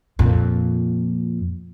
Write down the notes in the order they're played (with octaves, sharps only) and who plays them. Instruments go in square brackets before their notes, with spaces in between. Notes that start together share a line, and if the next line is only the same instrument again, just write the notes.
[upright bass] F2 A#2